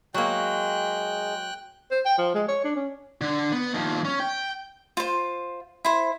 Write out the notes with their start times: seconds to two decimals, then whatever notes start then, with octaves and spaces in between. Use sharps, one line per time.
0.14 F#3 G#3 A#3 G5 F#6
1.91 C5
2.05 G5
2.18 F3
2.35 G#3
2.48 C#5
2.64 D4
2.76 C#4
3.21 D3
3.53 B3
3.74 D#2 F3
4.05 C#4
4.20 G5
4.97 F4 C5
5.85 E4 C5